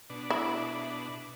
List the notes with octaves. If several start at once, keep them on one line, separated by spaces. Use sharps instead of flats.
B2 D4
E4